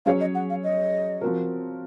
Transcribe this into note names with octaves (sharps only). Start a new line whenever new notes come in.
F#3 C#4 G#4 C#5 F5
D#5
F#5
F5
D#5
F3 C4 F#4 A#4